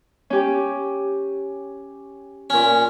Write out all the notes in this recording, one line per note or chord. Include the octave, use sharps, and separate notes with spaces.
C#4 G4
A#2 C#4